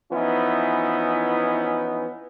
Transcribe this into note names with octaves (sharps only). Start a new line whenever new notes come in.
E3 F3 B3 C#4 D#4 E4